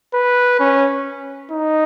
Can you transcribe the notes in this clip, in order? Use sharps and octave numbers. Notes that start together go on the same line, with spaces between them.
B4
C#4
D#4